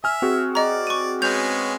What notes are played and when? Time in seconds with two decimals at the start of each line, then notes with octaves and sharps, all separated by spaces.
0.04 E5 G#5 F6
0.22 C4 F#4 G#4
0.55 D5 D#5 A#5
0.87 C#6 D#7
1.22 G#3 B3 C#4 G6 F7